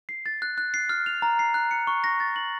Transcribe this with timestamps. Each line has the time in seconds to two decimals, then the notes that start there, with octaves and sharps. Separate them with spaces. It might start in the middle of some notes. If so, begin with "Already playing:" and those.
0.09 C7
0.26 A6
0.42 F#6
0.58 F#6
0.74 C7
0.89 F6
1.06 F7
1.22 A#5
1.39 C7
1.54 F#6
1.71 C#7
1.87 C#6
2.04 A#6
2.20 A6
2.36 F#7